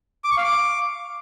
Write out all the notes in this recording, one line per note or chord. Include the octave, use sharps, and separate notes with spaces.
D6
C#6
F5
D6